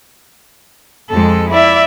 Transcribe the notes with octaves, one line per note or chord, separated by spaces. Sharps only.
F2 G#3 A4
E4 D5 E5